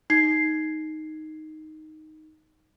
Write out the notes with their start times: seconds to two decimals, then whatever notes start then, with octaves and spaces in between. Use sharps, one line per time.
0.10 D#4 G#6 C7